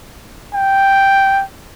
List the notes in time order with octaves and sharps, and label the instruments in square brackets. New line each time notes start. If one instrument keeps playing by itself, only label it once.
[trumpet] G5